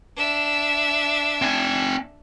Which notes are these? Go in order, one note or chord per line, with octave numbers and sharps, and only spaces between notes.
D4 E5
C4 G#5